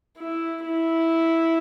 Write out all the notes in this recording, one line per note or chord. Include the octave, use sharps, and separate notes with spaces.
E4
E4